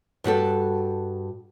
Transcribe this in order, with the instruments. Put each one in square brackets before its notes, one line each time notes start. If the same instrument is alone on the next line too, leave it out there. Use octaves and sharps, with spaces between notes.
[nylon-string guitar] G2 G3 F#4 A4